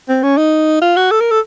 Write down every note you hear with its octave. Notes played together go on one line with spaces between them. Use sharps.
C4
C#4
D#4
F4
F#4
A4
A#4
A4